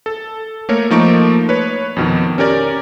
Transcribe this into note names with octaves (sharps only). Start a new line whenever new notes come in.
A4
A3 A#3 A#4 C#5
F3 A3 A#3 D#4 C#6 D7
B4 C#5
F2 B2 D#3
C#4 G4 A#4 D5